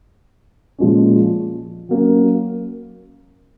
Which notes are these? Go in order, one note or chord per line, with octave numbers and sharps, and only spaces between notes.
A#2 F3 G#3 C#4
F#3 A#3 C#4